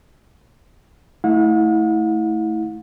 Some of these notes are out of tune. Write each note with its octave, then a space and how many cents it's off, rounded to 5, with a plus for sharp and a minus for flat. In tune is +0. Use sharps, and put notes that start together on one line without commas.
A3 +0 E4 -25 F#5 -45